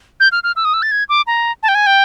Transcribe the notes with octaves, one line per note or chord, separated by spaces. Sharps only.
G6
F6
F6
E6
D#6
E6
A6
G#6
D6
A#5
A5
G5
G#5
G5